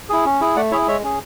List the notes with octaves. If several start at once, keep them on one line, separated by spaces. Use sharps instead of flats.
E4 G#4
C#4
E4 G#4
A3 D5 F#5
E4 G#4 C#5 E5
G#3 C#5 E5
C#4 G#4